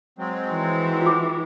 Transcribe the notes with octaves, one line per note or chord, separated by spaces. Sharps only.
F#3 G#3 C4
E3
F4 D6